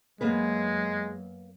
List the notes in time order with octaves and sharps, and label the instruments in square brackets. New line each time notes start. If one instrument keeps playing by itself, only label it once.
[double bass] F#2 [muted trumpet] G#3 [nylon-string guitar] A#3 B3 B4